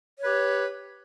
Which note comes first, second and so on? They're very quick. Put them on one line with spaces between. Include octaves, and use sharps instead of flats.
C#5 B4 G4